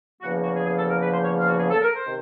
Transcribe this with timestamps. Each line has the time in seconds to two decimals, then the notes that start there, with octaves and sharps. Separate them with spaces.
0.21 E2 C#3 F3 A#3 F#4
0.43 F#4
0.56 G#4
0.66 G#4
0.79 A4
0.90 A#4
1.01 B4
1.13 C5
1.25 C#5
1.40 F4
1.48 F#4
1.59 G#4
1.70 A4
1.82 A#4
1.94 C5
2.06 C3 D#3